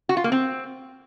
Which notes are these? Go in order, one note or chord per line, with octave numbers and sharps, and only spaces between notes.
F#4
F4
A#3
C4